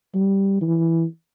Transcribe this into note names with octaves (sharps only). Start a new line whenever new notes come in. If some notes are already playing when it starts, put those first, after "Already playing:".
G3
E3